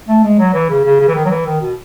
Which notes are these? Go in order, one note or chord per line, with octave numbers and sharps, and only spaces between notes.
A3
G#3
F#3
E3
C#3
C#3
C#3
E3
D#3
F#3
E3
D#3
B2